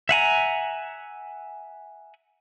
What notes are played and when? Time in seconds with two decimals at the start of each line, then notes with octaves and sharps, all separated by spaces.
0.09 E5 F#5 G#5 A#5